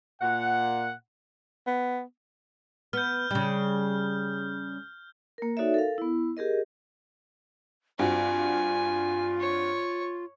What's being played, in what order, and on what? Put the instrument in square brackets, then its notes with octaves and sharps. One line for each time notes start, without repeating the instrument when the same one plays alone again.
[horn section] A#2 F#5
[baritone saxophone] B3
[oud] B3 [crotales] F6 G6
[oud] C#3 G3
[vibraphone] A#3 A#4
D#4 F#4 A4 C#5 D5 E5
A4 A#4 F5
B3 E4
G4 G#4 A#4 D#5
[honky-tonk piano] G2 C4 F#4 [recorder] F4 [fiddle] G#5
[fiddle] C#5